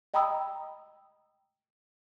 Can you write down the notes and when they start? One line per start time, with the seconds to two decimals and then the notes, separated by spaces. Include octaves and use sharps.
0.14 D#5 G5 A#5 B5 D#6 E6